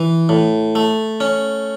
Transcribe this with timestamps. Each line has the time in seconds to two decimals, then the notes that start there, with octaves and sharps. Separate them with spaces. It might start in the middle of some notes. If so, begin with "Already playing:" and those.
Already playing: E3
0.29 A2
0.75 A3
1.20 C#4